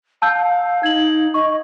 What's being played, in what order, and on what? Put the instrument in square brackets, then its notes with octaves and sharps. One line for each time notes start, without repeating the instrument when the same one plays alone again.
[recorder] F5 [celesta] A5 E6 G6
[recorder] D#4 [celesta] G#6 F#7
[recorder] D#5 [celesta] C#6